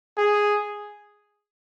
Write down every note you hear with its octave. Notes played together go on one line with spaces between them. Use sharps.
G#4